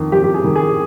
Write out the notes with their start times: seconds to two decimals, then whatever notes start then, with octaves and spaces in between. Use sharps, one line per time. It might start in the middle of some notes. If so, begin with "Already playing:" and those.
Already playing: F2 D#3
0.12 F2 G4
0.24 G4
0.34 G#4
0.44 D#3
0.56 G#4